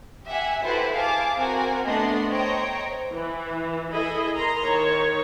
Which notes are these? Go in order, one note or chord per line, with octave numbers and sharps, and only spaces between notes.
G4 E5 F#5 G#5
E4 F#4 G4 A4 B4 C5
G#4 F5 A5 D6
C4 F#4 A#4 G#5
A3 B3 D4 D#5 C6
C5 C#5 D#5 G5 A#5 C#6
E3
E4 G#4 A4 D#5 B5
A#4 A#5 C6
D#3 C#5